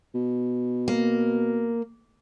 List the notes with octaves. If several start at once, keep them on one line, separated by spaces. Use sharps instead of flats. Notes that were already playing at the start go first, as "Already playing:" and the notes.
B2
A#3